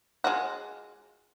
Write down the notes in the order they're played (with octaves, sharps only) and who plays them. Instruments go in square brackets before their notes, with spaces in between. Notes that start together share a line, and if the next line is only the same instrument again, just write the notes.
[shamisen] G#3 F4 F#4